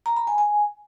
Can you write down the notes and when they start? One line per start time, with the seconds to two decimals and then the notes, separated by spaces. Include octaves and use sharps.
0.06 A#5
0.17 B5
0.27 G#5
0.38 G#5